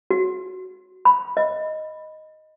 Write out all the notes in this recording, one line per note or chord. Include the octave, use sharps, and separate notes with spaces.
F#4
B5
D#5